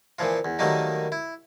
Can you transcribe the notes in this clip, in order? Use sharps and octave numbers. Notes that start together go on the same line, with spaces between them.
A#2 E3 F3 F4
E2
D#3 F#3 G3 A3 A#3 D#4
E4